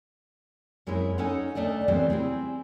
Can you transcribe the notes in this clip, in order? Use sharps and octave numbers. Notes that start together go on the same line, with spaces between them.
F#2 G#3 C4 C#4 E4
C#4 D#4 A4 C#5 F#5
D2 D#3 A3 D4 D5 D#5
C#3 E3 G3 A3 B3 C4
C4 E4 G#4